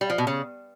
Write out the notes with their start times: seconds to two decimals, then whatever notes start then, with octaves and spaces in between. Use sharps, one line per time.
0.01 G3
0.10 F3
0.18 B2
0.27 C#3